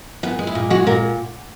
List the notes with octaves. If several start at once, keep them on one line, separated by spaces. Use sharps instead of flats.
A#2 B3
G#3
E4
A#2
G#3 F#4
A#2 A#4